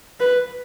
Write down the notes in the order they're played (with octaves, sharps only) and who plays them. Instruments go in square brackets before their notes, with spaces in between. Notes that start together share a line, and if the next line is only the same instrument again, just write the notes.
[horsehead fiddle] B4